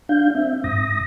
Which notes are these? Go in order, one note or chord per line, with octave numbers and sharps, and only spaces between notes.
D4 F5 G6
C4 E5
G#2 D#6 A#6